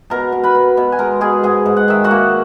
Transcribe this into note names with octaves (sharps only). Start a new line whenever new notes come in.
B2 A#4 A#5
B2
B4 B5
B2
B2
G#5
G#3 A#4 A#5
B2 G#4 G#5
G#2 G#4 G#5
G#2
F#5
D#3 E5
F#4 F#5
A#3